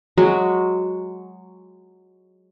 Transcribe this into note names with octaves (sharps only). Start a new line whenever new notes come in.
F#3 G#3